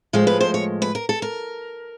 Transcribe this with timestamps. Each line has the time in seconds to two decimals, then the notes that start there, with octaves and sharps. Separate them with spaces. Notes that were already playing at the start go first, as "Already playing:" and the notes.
0.13 A2 F3 G#3 C5
0.27 B4
0.41 C5
0.54 C#5
0.82 B4
0.95 A#4
1.09 A4
1.22 A#4